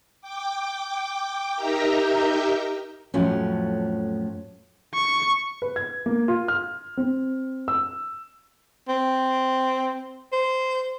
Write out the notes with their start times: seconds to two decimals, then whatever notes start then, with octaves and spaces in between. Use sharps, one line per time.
0.21 G5 D6
1.56 D#4 G4 A#4 E5 G5 A#5
3.14 F2 A2 F3 F#3 C#4
4.94 C#6
5.62 B4
5.76 G#6
6.06 A#3
6.28 F4
6.48 F6
6.97 C4
7.68 E6
8.89 C4
10.33 C5